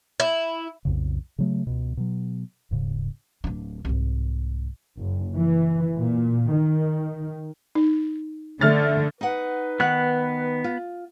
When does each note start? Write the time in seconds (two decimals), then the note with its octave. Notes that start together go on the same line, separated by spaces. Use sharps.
0.20 E4
0.85 B1 F2 C#3
1.38 C#3 F#3 A3
1.67 C#2 B2
1.97 B2 F#3
2.71 D#1 G#2 C#3
3.44 D1 D4
3.85 C2 G#2
4.99 F#1
5.37 E3
5.98 A#2
6.52 D#3
7.75 D#4
8.61 D3 A3 F6 A6
9.21 D#4 B4 F#5
9.80 D#3 B3 F#5 F#6
10.64 F4